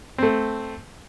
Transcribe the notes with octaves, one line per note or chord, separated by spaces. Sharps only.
A3 C4